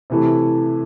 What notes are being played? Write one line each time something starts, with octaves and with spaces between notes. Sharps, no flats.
C3 E3 A3 E4